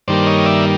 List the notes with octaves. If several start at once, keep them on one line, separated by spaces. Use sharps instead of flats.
G2 D#3 G3 A#3 C5 D5
C#5 D#5
D5 E5